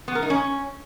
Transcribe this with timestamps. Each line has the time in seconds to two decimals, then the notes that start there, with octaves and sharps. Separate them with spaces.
0.08 B3
0.15 A#4
0.23 D#4
0.30 C#4